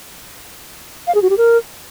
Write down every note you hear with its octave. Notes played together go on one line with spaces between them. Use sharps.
F5
G#4
F#4
G4
A#4